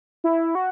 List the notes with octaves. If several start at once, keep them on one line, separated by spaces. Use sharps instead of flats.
E4
F#4